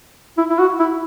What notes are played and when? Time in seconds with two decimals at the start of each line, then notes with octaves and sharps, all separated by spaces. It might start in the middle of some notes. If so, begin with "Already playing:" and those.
0.38 E4
0.49 E4
0.59 F#4
0.80 E4